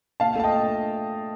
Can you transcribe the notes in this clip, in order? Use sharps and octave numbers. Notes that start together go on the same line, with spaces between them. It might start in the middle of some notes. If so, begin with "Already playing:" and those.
A#2 F5 A5
A3 A5
D#5 G5
A#2